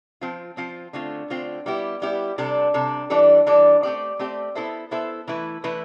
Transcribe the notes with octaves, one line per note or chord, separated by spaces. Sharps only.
F3 C4 F4
F3 C4 F4
D3 A3 C4 F4
D3 A3 C4 F4
G3 B3 E4 G4
G3 B3 E4 G4
C3 G3 D4 A4
C3 G3 D4 A4
E3 G3 D4 A4 D5
E3 G3 D4 A4 D5
A3 C4 G4 D5
A3 C4 G4 D5
B3 E4 A4 C5 E5
B3 E4 A4 C5 E5
E3 A3 E4 B4
E3 A3 E4 B4